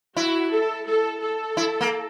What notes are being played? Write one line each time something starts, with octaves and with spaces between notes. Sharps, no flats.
E4 F#4
A4
A4
A4
E4
A#3